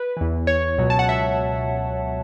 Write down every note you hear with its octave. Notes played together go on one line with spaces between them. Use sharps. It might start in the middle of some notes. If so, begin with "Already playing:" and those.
Already playing: B4
E2 E3
C#5
C#2 B2 F#3
A5
F#5
E5